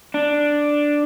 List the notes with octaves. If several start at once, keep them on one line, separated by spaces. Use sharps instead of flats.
D4